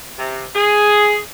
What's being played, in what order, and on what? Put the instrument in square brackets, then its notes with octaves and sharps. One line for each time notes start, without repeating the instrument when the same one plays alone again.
[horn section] C3
G#4